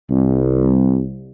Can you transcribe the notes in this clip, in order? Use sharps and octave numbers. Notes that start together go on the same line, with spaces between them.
C2